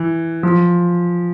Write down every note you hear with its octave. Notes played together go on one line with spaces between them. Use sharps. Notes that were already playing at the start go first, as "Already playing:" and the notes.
Already playing: E3
F3